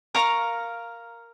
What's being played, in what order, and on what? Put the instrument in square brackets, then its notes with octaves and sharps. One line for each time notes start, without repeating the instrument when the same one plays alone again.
[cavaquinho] A#4 F5 A#5 C#6